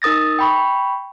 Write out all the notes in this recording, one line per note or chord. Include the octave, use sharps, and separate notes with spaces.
D#4 A#4 D#6 A6 A#6
G5 B5 C#6